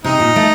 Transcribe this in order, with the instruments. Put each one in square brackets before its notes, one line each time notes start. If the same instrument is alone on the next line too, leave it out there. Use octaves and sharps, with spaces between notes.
[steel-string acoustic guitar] C3 [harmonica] D#4
[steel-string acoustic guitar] A#2
A3